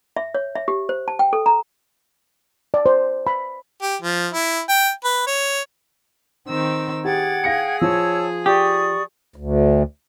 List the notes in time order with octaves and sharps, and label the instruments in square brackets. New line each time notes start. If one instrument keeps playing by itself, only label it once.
[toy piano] E5
C#5
E5
G4
C5
A5
G5
A4
A#5
[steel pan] D5
C5
B5
[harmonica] G4
F3
E4
G5
B4
C#5
[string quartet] D#3 C4 E6
[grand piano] G4 [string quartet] G#4 A6 [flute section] F#5 G5 G#6
[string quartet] G#4 [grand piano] F5 A#6 C#7
[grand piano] F3 [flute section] C#5 A5 E6
[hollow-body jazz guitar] G4 [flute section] D5 C#6 D#6
[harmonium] D2